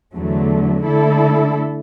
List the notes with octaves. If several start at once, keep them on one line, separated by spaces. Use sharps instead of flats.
E2 D3 F#3 A3
D3 A3 E4 A4